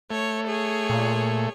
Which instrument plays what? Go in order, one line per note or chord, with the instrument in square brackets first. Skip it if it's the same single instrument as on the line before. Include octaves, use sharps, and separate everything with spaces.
[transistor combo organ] A3 [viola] C#5
[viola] G#4 C#5
[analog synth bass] A#2